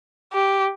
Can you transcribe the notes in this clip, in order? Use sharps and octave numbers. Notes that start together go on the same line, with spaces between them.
G4